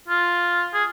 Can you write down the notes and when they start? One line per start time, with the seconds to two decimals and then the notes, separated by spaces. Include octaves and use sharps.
0.09 F4
0.74 G#4